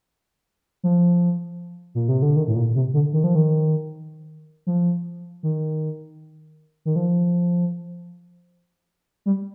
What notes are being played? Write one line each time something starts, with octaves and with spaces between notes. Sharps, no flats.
F3
A#2
C3
D3
D#3
A2
A#2
C3
D3
D#3
F3
D#3
F3
D#3
D#3
F3
G3